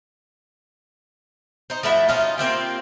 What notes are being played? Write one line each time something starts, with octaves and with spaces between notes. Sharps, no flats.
D#4 C5
F3 A3 E4 F#4
C#4 D#4 F4
A#3 C4 F4 G4